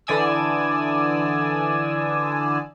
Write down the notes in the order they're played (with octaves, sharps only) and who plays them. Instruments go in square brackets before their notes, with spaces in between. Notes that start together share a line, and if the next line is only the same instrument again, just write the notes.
[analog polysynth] D3 E3 D5 G#5 D#6 E6